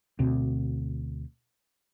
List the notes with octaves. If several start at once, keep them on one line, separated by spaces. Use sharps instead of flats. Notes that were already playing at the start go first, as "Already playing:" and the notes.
D2 B2 C4